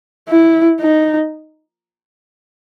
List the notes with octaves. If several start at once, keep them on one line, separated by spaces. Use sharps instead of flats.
E4
D#4